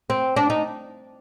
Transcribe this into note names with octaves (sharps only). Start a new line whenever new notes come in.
C4
D4
D#4